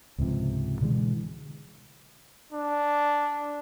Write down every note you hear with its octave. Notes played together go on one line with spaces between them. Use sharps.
C#2 G#2 C3 F3
B2 D3 E3 G#3
D4